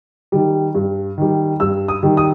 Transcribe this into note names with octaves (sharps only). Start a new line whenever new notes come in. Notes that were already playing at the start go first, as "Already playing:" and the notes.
D#3 G3
G2
D#3 G3
G2 E6
D#6
D#3 G3
D#6